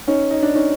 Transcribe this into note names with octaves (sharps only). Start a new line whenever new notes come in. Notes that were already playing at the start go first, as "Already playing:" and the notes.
C#4 D#4
D#4
D4
C#4 D#4